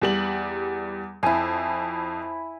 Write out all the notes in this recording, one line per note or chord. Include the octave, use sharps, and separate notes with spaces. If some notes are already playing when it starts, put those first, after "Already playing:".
E2 G3 F#7
F2 E4 G#5